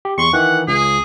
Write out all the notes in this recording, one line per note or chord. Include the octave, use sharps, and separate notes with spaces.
G4
E2 C6 C#6
D#3 E3 F#5
C#2 G#4